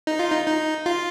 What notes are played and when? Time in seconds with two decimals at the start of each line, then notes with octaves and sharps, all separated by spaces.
0.07 D#4
0.19 F4
0.31 D#4
0.47 D#4
0.86 F4